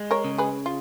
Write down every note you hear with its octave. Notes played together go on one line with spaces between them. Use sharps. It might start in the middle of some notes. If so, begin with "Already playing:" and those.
Already playing: G#3
A#4 C#5
C#3
G#4 B4
F4